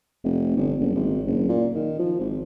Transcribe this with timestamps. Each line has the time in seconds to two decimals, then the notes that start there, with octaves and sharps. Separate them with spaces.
0.24 F1
0.57 G1
0.80 F#1
0.96 G#1
1.27 F#1
1.49 A#2
1.75 D#3
1.99 F3
2.19 G#1